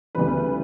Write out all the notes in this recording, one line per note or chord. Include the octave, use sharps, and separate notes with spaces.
D2 C#3 E3 G3 B4